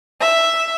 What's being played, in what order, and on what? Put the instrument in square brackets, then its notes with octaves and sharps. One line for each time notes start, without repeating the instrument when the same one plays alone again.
[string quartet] E5